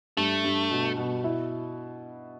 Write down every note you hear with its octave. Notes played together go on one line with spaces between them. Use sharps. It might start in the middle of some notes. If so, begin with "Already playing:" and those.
G2 A3
G2
B2
B2
E4